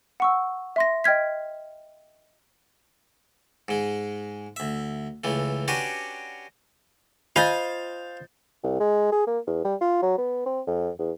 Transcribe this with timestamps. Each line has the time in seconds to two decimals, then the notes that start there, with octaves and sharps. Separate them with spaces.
0.20 F#5 C#6 E6
0.76 E5 C6 A#6
1.04 D#5 G5 F6 G#6 B6
3.68 G#2 G#3
4.56 D2 E5
5.24 C#2 E3 A3
5.68 C#4 D4 F#4 G4 B4 C#5
7.36 F4 C5 D#5 F5 G#5 G6 A6
8.64 C2
8.80 G#3
9.12 G#4
9.27 A#3
9.47 E2
9.65 G3
9.81 F4
10.02 F#3
10.18 B3
10.46 C4
10.67 F2
10.99 E2